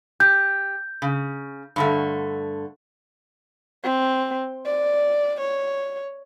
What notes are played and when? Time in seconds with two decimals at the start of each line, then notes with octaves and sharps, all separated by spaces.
0.20 G4 G6
1.02 C#3
1.76 G2 D3 A3
3.84 C4
4.65 D5
5.41 C#5